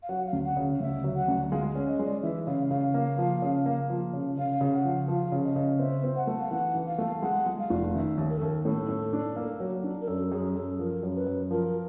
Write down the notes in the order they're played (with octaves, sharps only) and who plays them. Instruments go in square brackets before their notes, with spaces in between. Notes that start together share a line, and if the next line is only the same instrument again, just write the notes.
[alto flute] F5
[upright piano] F#3 [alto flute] F#5
[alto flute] F5
[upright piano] D2
[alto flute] F#5
[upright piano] C#3
[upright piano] D2 [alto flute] E5
[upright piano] F#3
[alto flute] F#5
[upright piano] D2
[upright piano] G#3 [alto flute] F5
[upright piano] C#4
[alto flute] D#5
[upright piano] G#3
[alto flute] D5
[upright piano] E3 [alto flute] E5
[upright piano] C#3 [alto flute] F5
[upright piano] C#3 [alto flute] F5
[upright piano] A#3
F3
C#3
A#3
F3
C#3
[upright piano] C#3 [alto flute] F5
[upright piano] C#3
[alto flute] F#5
[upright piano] F3
[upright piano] F3 [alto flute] F5
[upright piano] C#3
[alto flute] D#5
[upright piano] C#3
[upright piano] C4 [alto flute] E5
[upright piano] C4
[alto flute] F#5
[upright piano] A3
[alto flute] F5
[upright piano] E3 [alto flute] F#5
[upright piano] E3
[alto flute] F5
[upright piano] A3
[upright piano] G#3 [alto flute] F#5
[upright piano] G#3
[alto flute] F5
[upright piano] F1
[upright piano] D#3 [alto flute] E5
[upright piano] D#2
[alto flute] A#4
A4
[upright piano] D#2 [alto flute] A#4
[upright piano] A2 [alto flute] A4
[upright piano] A2
D4
A#3
F#3
D4
[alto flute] A#4
[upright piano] F#2 [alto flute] A4
[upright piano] F#2 [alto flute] G#4
[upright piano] F#2 [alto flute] A4
[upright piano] F3 [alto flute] A#4
[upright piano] F#2
[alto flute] B4
[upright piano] F#2
[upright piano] F3 [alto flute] A#4